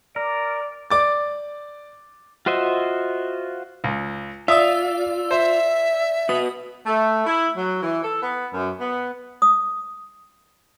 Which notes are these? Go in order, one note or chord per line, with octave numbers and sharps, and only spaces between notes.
A#4 D5
D5 D6 A6
F4 F#4 C5 D#5 E5
C#2
F4 D5 E5 D#6 E6
C5 E5
F#4 B4 D#6
A3
E4
F#3
E3
A4
B3
F#2
B3
D#6